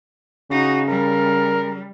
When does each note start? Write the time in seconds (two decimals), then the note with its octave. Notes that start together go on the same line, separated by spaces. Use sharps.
0.51 C#3 D#4 F#4
0.90 G3 A#4